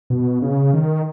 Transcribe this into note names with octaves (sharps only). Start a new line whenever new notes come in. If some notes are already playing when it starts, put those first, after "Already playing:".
B2
C#3
D#3